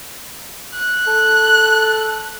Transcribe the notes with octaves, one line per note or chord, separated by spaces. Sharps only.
F#6
A4